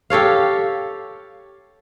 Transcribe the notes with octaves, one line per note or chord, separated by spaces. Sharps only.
G4 A4 C#5 F5